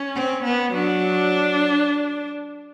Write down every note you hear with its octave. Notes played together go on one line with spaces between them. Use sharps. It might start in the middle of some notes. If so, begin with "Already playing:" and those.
Already playing: C#4
C4
B3
F#3 D4